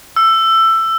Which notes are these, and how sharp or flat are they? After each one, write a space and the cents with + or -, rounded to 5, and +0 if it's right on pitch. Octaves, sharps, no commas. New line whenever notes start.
E6 +15